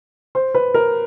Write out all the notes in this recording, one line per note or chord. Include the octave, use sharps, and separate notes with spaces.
C5
B4
A#4